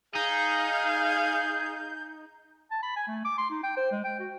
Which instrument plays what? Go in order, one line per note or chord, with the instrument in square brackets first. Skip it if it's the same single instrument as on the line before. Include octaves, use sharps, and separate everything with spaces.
[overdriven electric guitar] D#4 [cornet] G#4 [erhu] F5 [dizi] G6
[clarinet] A5
B5
G#5
A3
D6
C6
D#4
G5
C5
G#3
G5
F#4